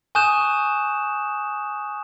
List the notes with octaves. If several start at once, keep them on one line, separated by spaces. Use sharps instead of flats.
G#5 C#6 D#6 F#6 G6 E7